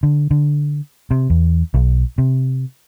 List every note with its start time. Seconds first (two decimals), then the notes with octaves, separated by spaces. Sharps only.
0.03 D3
0.31 D3
1.11 C3
1.30 E2
1.74 B1
2.18 C3